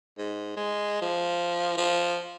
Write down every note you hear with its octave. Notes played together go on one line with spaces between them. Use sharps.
G#2
G#3
F3
F3